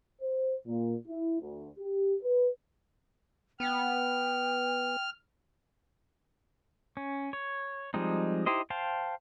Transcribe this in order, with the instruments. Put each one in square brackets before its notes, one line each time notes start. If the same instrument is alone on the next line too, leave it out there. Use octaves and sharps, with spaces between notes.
[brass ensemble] C5
A#2
E4
D2
G4
B4
[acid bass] B3 [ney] G5 [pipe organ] F6
[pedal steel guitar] C#4
C#5
F3 G3 G#3 C4 D#4
D#4 E4 G4 C5 D#5
C5 F5 G5 A5